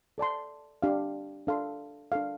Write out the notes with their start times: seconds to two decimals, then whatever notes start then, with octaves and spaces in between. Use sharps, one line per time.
0.18 A4 D5 A5 C6
0.82 D4 G4 F5
1.47 D4 A4 F5 C6
2.12 D4 A4 F5